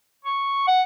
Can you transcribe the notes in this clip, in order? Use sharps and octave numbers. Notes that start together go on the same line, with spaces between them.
C#6
F#5